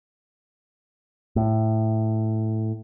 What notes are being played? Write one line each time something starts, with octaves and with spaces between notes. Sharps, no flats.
A2